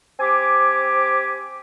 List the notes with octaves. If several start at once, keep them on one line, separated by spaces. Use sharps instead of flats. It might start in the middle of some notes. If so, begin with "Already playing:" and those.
C4 G4 G#5 D6